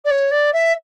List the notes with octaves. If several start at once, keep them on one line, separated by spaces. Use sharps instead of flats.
D5
C#5
D5
E5